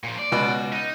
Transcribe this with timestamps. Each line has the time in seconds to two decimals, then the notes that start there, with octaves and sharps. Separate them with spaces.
0.04 A#2 F3
0.19 D5
0.32 C#2 B2 F#4
0.73 D#4